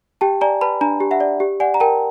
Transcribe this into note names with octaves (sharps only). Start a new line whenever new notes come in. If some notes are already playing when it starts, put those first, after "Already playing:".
G4 G5 A5
D5 G#5 A#5
B4 A5 B5
D4 G#5 A#5
G4
E5 F#5
D5
G4
D5 F#5 G#5
A#5
A#4 G5 A5